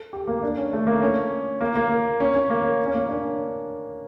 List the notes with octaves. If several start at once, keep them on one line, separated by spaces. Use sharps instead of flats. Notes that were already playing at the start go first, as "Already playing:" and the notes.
Already playing: A4
G4
A#3
D4
C#4
A3
A#3
C#4
A#3
A#3
C#4
C#4
A#3
C#4
A#3
D4
C#4